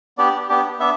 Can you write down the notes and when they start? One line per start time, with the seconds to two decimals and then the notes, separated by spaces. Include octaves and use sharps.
0.18 B3 D4 G4 D5
0.49 B3 D4 G4
0.79 B3 D4 E5